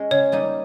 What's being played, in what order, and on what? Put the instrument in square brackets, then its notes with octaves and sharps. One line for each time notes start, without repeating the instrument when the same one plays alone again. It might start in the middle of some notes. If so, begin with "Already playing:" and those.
Already playing: [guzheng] G#3 C#4
[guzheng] C#3 [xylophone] C#5
[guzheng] G3 A#3 D#4